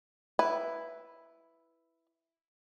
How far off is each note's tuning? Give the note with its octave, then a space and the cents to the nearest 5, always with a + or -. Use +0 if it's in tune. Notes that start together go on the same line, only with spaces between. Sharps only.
E4 +0 B4 +0